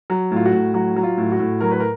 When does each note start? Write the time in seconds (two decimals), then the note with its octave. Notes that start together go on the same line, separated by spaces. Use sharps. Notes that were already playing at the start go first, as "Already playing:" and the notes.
0.10 F#3
0.31 A2 F4
0.45 F#4
0.53 A2
0.74 F#3 F#4
0.96 F#3
1.03 F4
1.18 A2
1.32 F#4
1.39 A2
1.61 F#3 A#4
1.71 B4
1.80 A#4